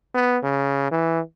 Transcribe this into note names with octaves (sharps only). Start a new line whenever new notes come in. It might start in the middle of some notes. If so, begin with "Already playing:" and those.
B3
C#3
E3